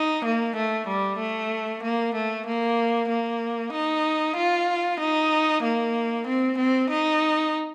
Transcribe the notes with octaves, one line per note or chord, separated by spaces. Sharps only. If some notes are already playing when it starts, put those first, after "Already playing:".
Already playing: D#4
A#3
A3
G3
A3
A#3
A3
A#3
A#3
D#4
F4
D#4
A#3
C4
C4
D#4